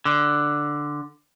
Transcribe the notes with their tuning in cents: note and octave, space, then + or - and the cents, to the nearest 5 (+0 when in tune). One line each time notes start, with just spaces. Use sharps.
D3 +5